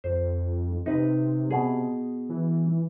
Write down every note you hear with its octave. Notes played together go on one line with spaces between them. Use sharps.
F2 C5
C3 D#4 B4
B2 G#4
E3